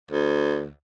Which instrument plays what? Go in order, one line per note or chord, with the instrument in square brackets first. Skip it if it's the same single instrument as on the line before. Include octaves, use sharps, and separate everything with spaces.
[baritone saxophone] D2